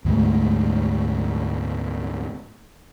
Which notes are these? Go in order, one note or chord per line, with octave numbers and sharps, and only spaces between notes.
D2 G#2 G#3 A3